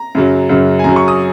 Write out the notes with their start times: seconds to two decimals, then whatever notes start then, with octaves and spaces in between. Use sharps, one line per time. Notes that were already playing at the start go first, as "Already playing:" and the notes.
Already playing: A#5
0.15 F#2 C#3 F#3
0.49 F#2 C#3 F#3
0.79 G#5
0.84 F#2 C#3 F#3 A#5
0.96 C#6
1.08 D#6